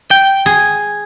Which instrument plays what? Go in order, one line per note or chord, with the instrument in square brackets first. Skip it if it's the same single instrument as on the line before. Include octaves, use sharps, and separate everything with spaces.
[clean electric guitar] G5
[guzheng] G#4